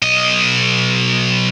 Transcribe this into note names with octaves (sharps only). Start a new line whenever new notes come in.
B1 D#5